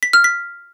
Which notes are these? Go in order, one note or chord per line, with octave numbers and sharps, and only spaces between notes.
B6
F6
B6